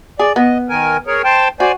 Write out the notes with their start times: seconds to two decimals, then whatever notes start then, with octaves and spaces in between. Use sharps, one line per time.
0.19 G#4 D5
0.36 B3 D#5
0.69 D#3 A#4 G#5
1.07 G#4 A#4 C#5
1.24 C5 G5 A5
1.60 F#4 C5 D5 G#5